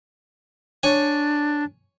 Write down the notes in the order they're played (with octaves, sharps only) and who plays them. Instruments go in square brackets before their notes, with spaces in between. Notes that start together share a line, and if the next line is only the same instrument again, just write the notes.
[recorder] D4 [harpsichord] C#5 G#5